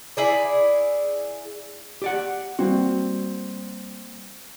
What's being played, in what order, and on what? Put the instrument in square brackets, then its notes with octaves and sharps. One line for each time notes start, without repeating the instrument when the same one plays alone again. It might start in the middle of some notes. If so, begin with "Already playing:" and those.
[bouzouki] E4 G#4 D5
[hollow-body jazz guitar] G4 D5 F#5
[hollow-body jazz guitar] G3 A#3 F#4 [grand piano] C4